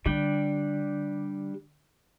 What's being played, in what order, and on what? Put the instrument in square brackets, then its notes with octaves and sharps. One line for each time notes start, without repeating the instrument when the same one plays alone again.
[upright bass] D3 [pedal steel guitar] G3 D4 G5